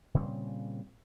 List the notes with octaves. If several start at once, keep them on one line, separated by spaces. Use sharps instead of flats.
A#2 C#3 G3 C4